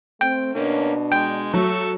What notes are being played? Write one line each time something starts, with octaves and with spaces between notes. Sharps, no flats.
A3 C4 G5
B2 A#3 C#4 D4
G#3 G5
F#3 A4 C#6